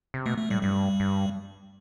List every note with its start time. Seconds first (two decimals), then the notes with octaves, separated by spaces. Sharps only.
0.14 C3
0.26 B2 A3
0.38 A3
0.50 A2 G3
0.63 G2 G3
1.00 G2